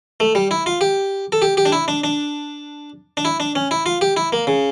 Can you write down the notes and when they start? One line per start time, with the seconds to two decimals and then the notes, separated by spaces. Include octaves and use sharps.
0.20 A3
0.35 G3
0.51 E4
0.66 F4
0.81 G4
1.32 A4
1.42 G4
1.57 G4
1.66 D4
1.72 E4
1.88 D4
2.04 D4
3.17 D4
3.25 E4
3.40 D4
3.55 C#4
3.71 E4
3.86 F4
4.01 G4
4.17 E4
4.33 A#3
4.47 C#3